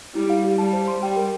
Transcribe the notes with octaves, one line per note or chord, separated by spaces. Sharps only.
G3 E4
F5
G4
G3 A5
C5
C6
G3 G5
A#4